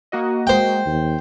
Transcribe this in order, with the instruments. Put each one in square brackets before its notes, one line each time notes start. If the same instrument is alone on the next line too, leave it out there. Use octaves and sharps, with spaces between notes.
[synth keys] A#3 F#4 D#5
[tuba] G#3 [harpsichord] C5 G5
[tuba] D#2